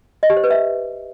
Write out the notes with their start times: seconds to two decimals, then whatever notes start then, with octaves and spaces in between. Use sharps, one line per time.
0.23 D#5
0.30 G4
0.37 C5
0.44 B4
0.51 E5